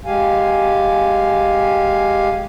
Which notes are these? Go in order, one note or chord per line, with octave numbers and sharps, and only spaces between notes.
G#3 G4 F5 G#5